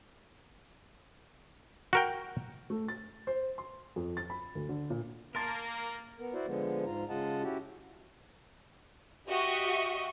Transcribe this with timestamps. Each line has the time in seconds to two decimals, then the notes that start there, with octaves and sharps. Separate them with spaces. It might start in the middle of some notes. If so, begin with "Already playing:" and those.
1.93 F#4 A#4 G5
2.70 A3
2.88 A6
3.27 C5
3.58 C6
3.96 F2
4.17 A6
4.30 B5
4.55 D2
4.69 D3
4.90 A#2
5.35 A#3 A#4 A5 C6 A6
6.19 B3 A#4
6.34 E4 F#4 C5 D5
6.47 D3 F3 G#3 B3
6.86 G#2 F4 A#5
7.09 C#3 G#3 F4 D#5 F#5 A5
7.43 C#4 E4 F#4 G4
9.29 F#4 G4 D#5 E5 C#6